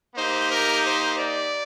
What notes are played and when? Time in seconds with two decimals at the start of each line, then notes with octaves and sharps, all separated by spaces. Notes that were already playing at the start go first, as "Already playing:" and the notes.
0.16 A#3 D#4 G4 C5
0.49 A#4
0.82 C5
1.16 D5